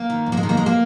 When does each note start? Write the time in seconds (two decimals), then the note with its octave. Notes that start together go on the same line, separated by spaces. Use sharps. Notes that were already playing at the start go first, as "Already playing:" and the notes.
Already playing: A#3
0.10 D#3
0.26 G#2
0.32 A#3
0.37 G#3
0.43 D#3
0.49 A#3
0.57 G#3
0.66 A#3